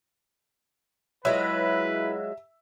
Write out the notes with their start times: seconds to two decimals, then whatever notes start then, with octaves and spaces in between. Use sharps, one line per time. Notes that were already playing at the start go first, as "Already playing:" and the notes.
1.25 F#3 G#3 E4 F4 B4 E5